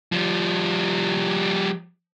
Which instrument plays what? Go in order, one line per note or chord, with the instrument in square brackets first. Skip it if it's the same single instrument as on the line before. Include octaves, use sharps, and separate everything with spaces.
[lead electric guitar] F3 G3